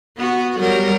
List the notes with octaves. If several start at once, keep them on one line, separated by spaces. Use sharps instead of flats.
B3 F#4
F#3 G3 A#4